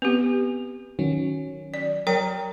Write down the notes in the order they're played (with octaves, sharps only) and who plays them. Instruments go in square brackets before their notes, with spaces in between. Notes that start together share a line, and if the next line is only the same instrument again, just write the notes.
[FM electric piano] B3 [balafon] C4 G4
[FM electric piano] D#3 F#3 C#4
[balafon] D5
[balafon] F#3 C#5 G5 [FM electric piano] A#4